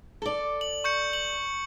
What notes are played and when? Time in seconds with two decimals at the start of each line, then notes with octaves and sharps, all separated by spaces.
0.22 A4 D5
0.61 F#7
0.84 C#6 G6 C#7
1.13 F#7